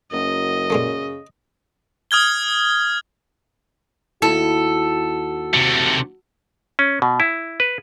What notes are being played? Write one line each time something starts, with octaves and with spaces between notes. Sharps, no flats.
F#1 F#2 D#5
A#2 C#3 G#3 A3
D#6 F6 G#6 G7
D#2 E4 F#4 A4
C3 A3
C#4
B2
E4
B4